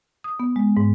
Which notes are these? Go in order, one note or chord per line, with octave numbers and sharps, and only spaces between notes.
D#6
B3
G#3
G#2